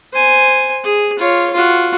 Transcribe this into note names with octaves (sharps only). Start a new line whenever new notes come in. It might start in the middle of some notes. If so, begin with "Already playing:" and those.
C5 G#5
G#4
F4 C#5
F4 F#4